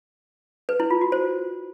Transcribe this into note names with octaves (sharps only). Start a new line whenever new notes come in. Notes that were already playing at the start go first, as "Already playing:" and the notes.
B4
E4
F4
F#4
C5